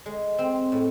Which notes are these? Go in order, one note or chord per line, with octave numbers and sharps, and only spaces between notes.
G#3
C4
A2